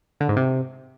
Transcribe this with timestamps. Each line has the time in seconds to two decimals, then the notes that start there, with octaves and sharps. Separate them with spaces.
0.20 D3
0.28 G#2
0.36 C3